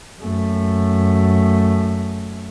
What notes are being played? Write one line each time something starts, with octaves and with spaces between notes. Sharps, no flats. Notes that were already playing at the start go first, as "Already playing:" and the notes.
F#2 A3